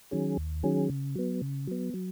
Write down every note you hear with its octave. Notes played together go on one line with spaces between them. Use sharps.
D#3 F#3 C#4 G#4
D#2
D#3 F#3 C#4 G#4
C#3
F#3 B3
C#3
F#3 B3
F#3